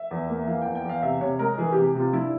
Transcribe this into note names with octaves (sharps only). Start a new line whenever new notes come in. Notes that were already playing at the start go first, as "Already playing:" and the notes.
Already playing: E5
E2
A#3
E3 F5
E2 G5
G5
E2 F5
C3 E5
C3 C#5
G#3 A#4
E3 G#4
C3 G4
C3 F4
G2 E4